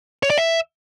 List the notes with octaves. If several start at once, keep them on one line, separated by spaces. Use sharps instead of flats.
C#5
D5
E5